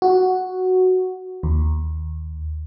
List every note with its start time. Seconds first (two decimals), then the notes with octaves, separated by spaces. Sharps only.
0.02 F#4
1.43 D#2